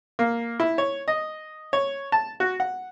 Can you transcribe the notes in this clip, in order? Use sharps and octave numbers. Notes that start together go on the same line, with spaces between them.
A#3
E4
C#5
D#5
C#5
A5
F#4
F#5